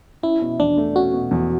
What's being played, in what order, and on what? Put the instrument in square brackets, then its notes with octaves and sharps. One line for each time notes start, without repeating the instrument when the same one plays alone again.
[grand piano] C#4 [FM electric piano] E4
[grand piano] B2
[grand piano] E2 [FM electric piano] D4
[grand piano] A3
[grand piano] C#4 [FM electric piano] F#4
[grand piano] B2
E2